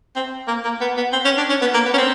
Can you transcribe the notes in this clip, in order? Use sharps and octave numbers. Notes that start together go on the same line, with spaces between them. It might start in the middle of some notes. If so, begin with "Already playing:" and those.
C4
A#3
A#3
B3
B3
C4
C#4
D4
C#4
B3
A#3
B3
C#4
C4